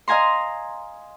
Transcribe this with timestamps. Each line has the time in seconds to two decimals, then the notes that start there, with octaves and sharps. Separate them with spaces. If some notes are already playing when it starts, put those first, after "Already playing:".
0.08 D#5 F5 G#5 A#5 C6